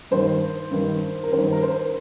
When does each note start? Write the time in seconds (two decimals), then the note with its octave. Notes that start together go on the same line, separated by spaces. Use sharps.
0.11 G2 D#3 C5
0.71 G2 D#3
1.23 A#4
1.32 G2 D#3 C5
1.52 A#4
1.63 C5